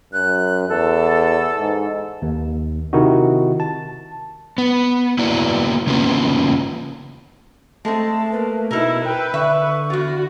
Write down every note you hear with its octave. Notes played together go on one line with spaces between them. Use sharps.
F#2 F#6
E2 A4
G#2
D#2
C3 D#3 D#4 E4 F#4
A5
B3
A#3 B3 E4 F#4 D5
C#3 A#3 B3 C#4 F4
G#3 A3 C4 A5
A#3 B4
B2 D#4 E4 A#4 E6
B4 G5
D3 E5 C#6
E2 F4 F#4